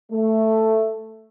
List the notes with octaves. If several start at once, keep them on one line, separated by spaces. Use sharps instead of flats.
A3